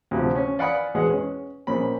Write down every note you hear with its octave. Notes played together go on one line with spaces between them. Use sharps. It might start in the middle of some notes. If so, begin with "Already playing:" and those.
D2 C3 F3
C#4
D5 F5 F#5 G#5 B5 D#6
E2 B2 G#3 G#4 F#5
C#4
A#1 C#4 C5 B5